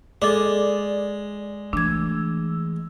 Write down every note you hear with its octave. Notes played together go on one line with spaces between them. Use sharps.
G#3 A4 D5 D6
E3 A3 D4 E6 G#6